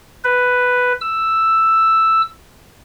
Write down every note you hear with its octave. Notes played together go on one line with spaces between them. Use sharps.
B4
E6